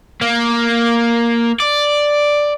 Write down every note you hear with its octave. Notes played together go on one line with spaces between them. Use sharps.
A#3
D5